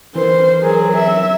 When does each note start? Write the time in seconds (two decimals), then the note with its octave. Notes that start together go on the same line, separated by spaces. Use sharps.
0.15 E3 A#4 C5
0.63 F#3 G#4
0.93 E5